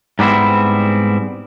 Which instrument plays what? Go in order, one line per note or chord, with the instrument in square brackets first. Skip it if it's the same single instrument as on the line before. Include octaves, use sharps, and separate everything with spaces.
[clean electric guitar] G#2 G3 B3 C4 E4